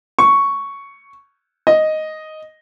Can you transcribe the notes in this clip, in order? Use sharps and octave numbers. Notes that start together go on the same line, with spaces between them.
C#6
D#5